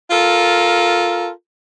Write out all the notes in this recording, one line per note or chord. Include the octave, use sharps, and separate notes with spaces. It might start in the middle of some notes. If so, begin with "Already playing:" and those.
F4 A4 A#4